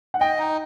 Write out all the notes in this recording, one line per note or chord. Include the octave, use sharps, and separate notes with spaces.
F#5
D#5 G5
D#4